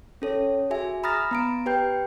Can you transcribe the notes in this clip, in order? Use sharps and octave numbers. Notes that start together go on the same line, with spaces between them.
C#4 A4 C#5
F#4 G#4 E5 G#5
A#5 B5 D#6 F6 A6 A#6
B3 A#5 D7
G4 B4 G5 G6